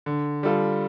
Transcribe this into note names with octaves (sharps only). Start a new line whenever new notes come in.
D3
G3 F4 A4